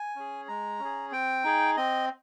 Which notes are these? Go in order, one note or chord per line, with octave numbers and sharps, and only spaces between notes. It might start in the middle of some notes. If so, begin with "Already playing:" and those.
Already playing: G#5
C#4 G#4
G#3 A#5
C#4
G#4
C4 G5
D#4 G#4
C4 D#5